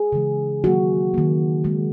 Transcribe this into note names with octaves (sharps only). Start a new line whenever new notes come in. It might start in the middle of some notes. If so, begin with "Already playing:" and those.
Already playing: G#4
C#3 E3 G#3
D#3 F#3 A#3 F#4
D#3 A#3
D#3 G#3